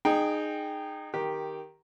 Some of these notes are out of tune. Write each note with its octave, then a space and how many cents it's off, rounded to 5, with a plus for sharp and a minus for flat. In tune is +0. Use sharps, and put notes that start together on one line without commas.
D#4 -25 G#4 +0 G5 +0
D#3 +0 G4 +0